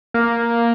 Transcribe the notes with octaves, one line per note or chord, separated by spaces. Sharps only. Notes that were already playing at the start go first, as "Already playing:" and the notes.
A#3